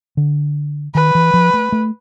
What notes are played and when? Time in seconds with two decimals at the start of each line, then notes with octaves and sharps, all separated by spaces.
0.17 D3
0.94 D#3 B4
1.15 E3
1.34 F3
1.54 A3
1.72 A3